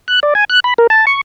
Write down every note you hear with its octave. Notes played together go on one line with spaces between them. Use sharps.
F#6
D5
G#5
F#6
B5
A#4
A5
C#6